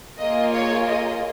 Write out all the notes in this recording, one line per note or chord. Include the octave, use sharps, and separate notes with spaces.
A#3 F4 G#4 D#5
C#5
D#5